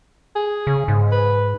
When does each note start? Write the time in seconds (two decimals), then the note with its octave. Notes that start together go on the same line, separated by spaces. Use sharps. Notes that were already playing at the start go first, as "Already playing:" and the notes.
0.36 G#4
0.67 C#3
0.88 G#2
1.12 B4